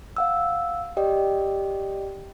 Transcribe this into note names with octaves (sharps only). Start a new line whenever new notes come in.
F5 F#5 E6
G4 D5 D#5 G5